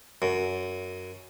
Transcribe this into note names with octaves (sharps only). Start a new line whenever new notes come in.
F#2